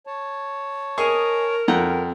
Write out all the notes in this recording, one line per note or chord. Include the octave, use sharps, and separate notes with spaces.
C#5 A5
G#4 A#4 D#5 G#5 C#6
F2 F#5 G5 A#5